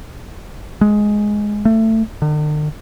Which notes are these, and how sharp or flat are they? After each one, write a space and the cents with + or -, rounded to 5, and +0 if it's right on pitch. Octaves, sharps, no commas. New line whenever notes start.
G#3 +5
A3 +20
D3 +45